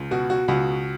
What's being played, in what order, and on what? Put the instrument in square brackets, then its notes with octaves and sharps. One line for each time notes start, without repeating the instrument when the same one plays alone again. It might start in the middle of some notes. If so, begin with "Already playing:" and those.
Already playing: [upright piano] C#2
B2 F#4
F#4
C#2 F#4